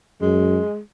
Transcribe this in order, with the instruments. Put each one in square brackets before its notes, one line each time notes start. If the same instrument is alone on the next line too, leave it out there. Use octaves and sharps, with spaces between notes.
[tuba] F#2 [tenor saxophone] G#3